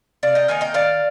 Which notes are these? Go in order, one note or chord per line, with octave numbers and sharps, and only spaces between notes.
C3 D5 F5
D#5 G5
D#3 A#3 D#4 G#5
D#5 G5
D#3 D5 F5